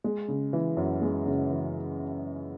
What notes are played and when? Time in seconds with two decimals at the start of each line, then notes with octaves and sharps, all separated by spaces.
0.04 G#3
0.28 C#3
0.53 E3
0.77 F#2
1.02 G#3
1.26 C#3
1.50 E3